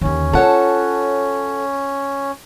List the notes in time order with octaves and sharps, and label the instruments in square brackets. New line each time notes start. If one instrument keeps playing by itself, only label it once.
[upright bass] D#2 D3 [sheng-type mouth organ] C#4
[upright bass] F4 [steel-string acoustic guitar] A4 F#5 [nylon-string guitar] C#5 A5